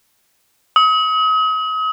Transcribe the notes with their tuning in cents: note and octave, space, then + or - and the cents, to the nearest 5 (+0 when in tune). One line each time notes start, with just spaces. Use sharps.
D#6 +40